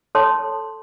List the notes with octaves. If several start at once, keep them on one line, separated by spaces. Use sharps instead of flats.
A4 C#5 A5 C6